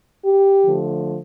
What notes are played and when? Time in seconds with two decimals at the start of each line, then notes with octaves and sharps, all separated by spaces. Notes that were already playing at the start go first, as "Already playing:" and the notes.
0.25 G4
0.65 D3 F3 A3